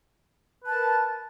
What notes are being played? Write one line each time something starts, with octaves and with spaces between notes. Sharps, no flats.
A#4 B4 A5